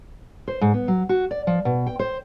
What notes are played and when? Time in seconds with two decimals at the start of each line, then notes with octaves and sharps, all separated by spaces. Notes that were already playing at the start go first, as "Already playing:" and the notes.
0.48 C5
0.61 G#2
0.74 B3
0.88 F#3
1.09 F#4
1.31 D5
1.47 F3
1.65 B2
1.87 G5
1.99 C5